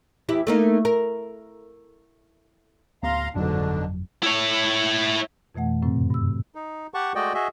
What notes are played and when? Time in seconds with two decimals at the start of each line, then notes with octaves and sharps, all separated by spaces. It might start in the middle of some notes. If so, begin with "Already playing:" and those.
0.29 E2 E4 G4
0.47 A3 A#3 D#4
0.85 A#4
3.03 D1 D2 B3 F5 A#5 C6
3.35 G1 F2 G#2 B2 D3 F#3 D4
4.23 E4 C#5
5.55 F2 B2 E3 A3 F#5
5.82 F#2 A2 C3 C4
6.10 G2 E6
6.55 D#4
6.94 G4 F#5 A5 C#6
7.15 G#3 A3 F#4 D5 D#5 G5
7.34 F#4 G#4 D#5 E5